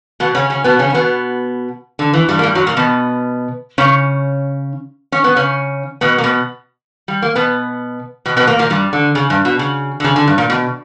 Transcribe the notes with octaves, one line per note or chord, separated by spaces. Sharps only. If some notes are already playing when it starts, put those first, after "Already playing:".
B2 B3
C#3 C#4
C#3 C#4
B2 B3
C#3 C#4
C#4
B2 B3
D3
E2 E3
G2 G3
A#3
G2 G3
F#2 F#3
A#2 A#3
B2 B3
C#3 C#4
C#4
B3
C#3 C#4
B2 B3
A#3
B2 B3
G3
A#3
B2 B3
B2 B3
B2 B3
A#2 A#3
A#2 A#3
G2 G3
D3
C#3
G2
B2
C#3
D3
C#3
D3
G2
A#2
B2